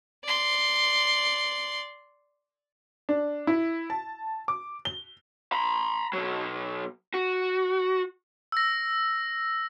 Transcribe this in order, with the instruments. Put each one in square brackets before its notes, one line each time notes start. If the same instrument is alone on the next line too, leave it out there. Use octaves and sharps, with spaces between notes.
[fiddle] D5 C6
[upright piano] D4
E4
A5
D6
G7
[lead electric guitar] A#5 B5
B2 F#3
F#4
[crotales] E6 A#6